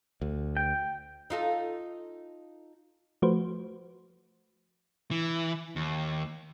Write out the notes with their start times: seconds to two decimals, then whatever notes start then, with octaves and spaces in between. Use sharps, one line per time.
0.21 D2
0.57 G5
1.30 D#4 F4 A4
3.22 F3 A3 F#4 B4 C5
5.11 E3
5.76 D#2